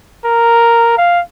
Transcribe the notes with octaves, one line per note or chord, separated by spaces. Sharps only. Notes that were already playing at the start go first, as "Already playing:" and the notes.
A#4
F5